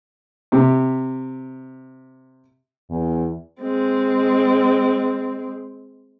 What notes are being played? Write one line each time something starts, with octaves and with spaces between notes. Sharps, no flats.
C3 G4
E2
G#3 C4